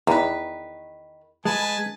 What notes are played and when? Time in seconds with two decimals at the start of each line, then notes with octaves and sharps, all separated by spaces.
0.07 E2 D#3 B4
1.45 G#3 B4 G#5 A5